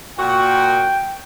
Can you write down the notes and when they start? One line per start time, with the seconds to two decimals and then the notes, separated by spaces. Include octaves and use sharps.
0.18 A#2 F#4 G5